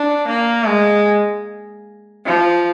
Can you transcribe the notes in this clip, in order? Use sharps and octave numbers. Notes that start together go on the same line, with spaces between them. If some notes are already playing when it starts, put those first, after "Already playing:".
Already playing: D4
A#3
G#3
F3